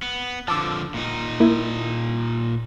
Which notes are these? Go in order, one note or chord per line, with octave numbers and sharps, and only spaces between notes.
B3
D3 F3 A5 D6 E6
A#2 D#4
A#3 E4